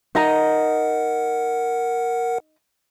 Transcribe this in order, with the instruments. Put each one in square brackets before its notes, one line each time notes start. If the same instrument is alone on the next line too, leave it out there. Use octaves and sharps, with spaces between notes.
[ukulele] D#4 D#5 A#5 [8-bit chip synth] A#4 F#5